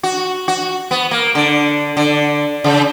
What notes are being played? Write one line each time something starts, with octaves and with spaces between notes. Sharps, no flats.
F#4
F#4
B3
A#3
D3
D3
C#3